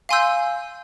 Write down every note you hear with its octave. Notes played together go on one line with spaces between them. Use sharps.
F5 G#5 C6 E6 G6